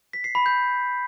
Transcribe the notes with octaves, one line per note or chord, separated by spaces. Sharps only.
B6
C7
B5
G6